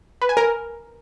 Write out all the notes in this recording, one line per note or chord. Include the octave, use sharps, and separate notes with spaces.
B4
G#5
A#4